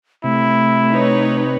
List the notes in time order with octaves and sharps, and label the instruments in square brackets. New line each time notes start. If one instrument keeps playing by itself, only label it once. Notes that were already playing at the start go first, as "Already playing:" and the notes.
[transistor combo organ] C3 [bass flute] A3 [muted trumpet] E4
[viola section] D#4 B4 C#5